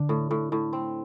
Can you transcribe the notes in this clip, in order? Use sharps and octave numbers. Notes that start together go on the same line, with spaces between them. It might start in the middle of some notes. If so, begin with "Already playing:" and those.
Already playing: D3 D4
A2
A2
A2
C4